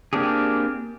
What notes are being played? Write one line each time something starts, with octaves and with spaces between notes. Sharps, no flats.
A#3 C4 D4 G4 G#4